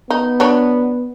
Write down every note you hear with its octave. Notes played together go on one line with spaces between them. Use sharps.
B3 D#4
F#3 D4 C#5